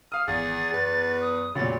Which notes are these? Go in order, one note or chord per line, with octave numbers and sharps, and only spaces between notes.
F5 D#6 F6
G#1 E2 G#4 A6
F#2 B4
D#6
F1 A#2 C#3 F#3 A6